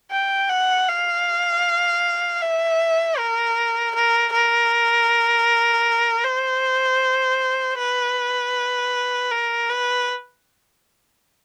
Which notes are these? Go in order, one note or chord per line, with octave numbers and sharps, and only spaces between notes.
G5
F#5
F5
E5
A#4
A#4
A#4
C5
B4
A#4
B4